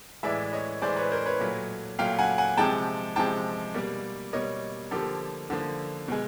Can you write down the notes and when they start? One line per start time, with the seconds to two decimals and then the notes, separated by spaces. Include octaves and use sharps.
0.23 A2 E3 G#3 D5 E5
0.53 C#5 D#5
0.82 A2 E3 G#3 C5 D5
0.96 B4 C#5
1.11 A#4 C5
1.26 B4 C#5
1.40 A#2 F#3 A3
1.99 A#2 F#3 A3 F5 G5
2.18 F#5 G#5
2.38 F#5 G#5
2.57 C3 F3 G#3 G5 A5
3.16 C3 F3 G#3 G5 A5
3.74 B2 G3 A#3
4.33 B2 G3 A#3 C#5 D#5
4.91 D3 F3 A#3 G4 A4
5.50 D3 F3 A#3
6.08 B2 G#3